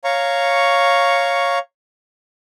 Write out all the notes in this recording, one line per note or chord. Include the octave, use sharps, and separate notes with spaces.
C#5 F5 A#5 C#6